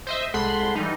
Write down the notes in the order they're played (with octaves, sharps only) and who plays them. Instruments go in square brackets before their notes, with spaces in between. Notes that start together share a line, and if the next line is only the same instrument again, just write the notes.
[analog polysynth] C5 D#5 E5
[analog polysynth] C2 B5 C6 [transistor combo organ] G#3 A4 F#5
[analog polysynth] E3 G3 D#4